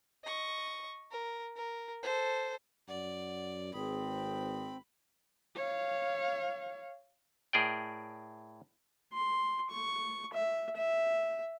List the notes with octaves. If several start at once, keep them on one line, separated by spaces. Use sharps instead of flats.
D#5 C#6
A#4
A#4
A4 C5
F#2 D5 F#5
G#1 C4 G#4 B4 B5 D#6
C#5 F5
A2 G#4 A#4 D5 G5
C6
C#6
E5
E5